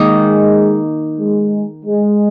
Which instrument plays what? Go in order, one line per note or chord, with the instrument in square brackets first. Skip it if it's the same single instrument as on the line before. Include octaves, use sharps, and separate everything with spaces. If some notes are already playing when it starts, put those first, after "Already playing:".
Already playing: [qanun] D#3 A#3 D#4 [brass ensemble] G#3
[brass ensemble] G#3
G#3